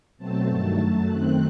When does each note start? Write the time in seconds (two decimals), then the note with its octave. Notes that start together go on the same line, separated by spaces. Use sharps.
0.18 B2 F#3 A3 C4 A5
0.48 G2 D#3 F#3 A3 A5
0.78 F#2 F#3 A3
1.08 F#2 D#3 A3 C4 F#6